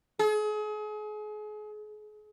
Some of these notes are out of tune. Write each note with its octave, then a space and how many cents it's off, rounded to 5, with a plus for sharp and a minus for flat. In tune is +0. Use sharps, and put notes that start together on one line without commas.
G#4 +35